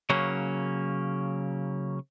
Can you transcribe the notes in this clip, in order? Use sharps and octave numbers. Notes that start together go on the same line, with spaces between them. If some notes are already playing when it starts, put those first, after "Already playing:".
C#3 F#3 A#3 C#4